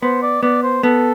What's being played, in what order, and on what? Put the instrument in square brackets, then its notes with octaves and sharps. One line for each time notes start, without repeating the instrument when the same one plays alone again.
[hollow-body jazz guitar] B3 [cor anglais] C5
[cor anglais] D5
[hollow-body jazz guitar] B3 [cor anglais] D5
[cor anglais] C5
[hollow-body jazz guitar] B3 [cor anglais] A4